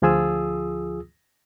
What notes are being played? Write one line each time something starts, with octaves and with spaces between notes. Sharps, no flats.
D2 F3 F4 G#4 D#6 E6